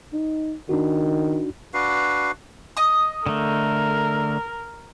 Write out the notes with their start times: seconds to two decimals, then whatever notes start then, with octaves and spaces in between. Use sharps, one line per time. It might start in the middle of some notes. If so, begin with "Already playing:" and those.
0.13 D#4
0.69 D#3 D4 D#4 F#4
1.74 D4 F#4 B4 F5
2.77 D#5 D#6
3.26 D3 A3 A#4